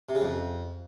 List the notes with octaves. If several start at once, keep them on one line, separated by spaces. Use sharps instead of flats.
C3
C#3
F2